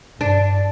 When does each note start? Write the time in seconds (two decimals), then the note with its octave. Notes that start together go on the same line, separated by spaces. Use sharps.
0.20 G2 D4